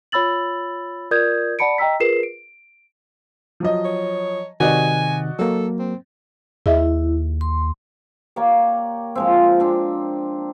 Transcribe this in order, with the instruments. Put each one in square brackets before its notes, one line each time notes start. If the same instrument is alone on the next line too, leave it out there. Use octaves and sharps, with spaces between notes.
[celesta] F4 C#5 B5 E6 A6 F#7
F4 A#4 D5 D#6 G6 G#6
D5 F#5 A5 B5 C#7 D7
D#5 G5 A#5 E6 B6
F4 G#4 A#4 B4 C7 E7
D7
[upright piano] F3 F#3 D#5
[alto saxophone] C#5
[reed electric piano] C3 D#3 [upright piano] F#4 D5 D#5 [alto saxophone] G#5
[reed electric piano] F#3 A#3 [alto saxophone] A4
[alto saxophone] C4
[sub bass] D#2 [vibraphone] E4 [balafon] G#4 D#5 E5
[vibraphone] C6
[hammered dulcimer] A#3 G4 C#5 D5
F3 G#3 C4
C4 D4